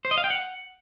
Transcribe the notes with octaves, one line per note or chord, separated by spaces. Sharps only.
C5
D#5
F5
G5
F#5